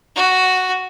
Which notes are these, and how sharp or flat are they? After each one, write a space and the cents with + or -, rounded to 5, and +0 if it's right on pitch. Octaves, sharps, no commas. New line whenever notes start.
F#4 +0